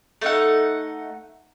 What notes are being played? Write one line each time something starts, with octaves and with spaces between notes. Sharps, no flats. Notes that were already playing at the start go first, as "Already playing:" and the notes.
A3 D#4 F#5